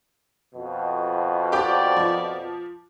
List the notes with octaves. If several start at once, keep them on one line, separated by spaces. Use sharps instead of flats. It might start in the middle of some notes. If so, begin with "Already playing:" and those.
F2 B2
G4 D5 D6
F3